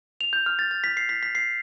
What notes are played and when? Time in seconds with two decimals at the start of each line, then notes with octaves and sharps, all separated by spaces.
0.21 F7
0.33 G6
0.46 F6
0.59 A6
0.71 A6
0.84 B6
0.97 C7
1.09 B6
1.23 B6
1.35 C7